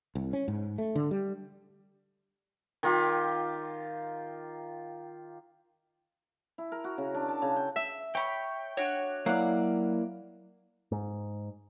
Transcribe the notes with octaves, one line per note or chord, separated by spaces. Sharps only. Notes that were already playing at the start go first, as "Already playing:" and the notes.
C2
C#4
G#2
A3
D3
G3
D#3 F4 G4
E4
A#4
F#4
C#3
D4
A5
C#3
G5
E5
C#5 G5 B5
D4 F#4 C#5
F#3 A#3 E4 D5 F5 F#5
G#2